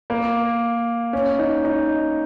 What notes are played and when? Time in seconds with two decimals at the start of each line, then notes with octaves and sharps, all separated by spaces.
0.10 A#3
1.13 C#4
1.39 D#4
1.65 D#4